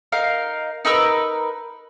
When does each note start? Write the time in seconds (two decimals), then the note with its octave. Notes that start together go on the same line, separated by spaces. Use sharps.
0.12 D#4 A#4 F5
0.85 D#4 A#4 B4 E6